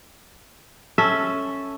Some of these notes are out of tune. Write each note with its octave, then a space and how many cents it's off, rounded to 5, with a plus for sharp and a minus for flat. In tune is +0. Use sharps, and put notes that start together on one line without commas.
C#4 +0 A4 +0 E5 -15